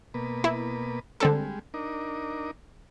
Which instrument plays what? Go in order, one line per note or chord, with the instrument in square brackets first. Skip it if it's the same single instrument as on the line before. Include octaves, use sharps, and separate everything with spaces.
[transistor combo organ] B2 A#3 B4
[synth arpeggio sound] E4
[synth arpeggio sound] D3 C4 A4 [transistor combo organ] G3 G#3
[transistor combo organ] D4 D#4 A#4